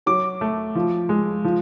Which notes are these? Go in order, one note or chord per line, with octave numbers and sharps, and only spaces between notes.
F#3 D6
A3
F3
G#3
F3